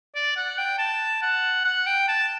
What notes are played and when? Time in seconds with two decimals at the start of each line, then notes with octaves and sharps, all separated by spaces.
0.16 D5
0.37 F#5
0.58 G5
0.79 A5
1.22 F#5
1.65 F#5
1.87 G5
2.09 A5